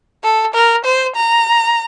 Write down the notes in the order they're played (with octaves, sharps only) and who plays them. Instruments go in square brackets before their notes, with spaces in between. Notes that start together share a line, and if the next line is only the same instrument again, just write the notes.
[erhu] A4
A#4
C5
A#5